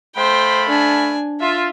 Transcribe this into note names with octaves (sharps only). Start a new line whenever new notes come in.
A3 C5 F5 G5 B5
D4 G#5
F4 E5